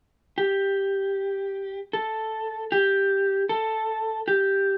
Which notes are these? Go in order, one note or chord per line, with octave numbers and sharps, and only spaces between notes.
G4
A4
G4
A4
G4